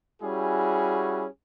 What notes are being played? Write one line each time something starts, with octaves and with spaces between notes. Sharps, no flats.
G3 C#4 E4 F#4 G#4